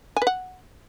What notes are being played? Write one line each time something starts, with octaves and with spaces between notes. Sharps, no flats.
G#5
B4
F#5